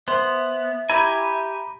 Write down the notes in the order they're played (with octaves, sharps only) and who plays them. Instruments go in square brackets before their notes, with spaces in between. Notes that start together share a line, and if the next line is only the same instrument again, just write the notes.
[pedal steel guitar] B3 [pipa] C5 [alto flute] E5
[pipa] E4 [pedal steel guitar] G4 G#5 [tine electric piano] A#5 B5